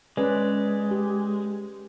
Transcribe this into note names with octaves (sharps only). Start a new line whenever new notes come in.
G#3 C#4 B4 D5
G4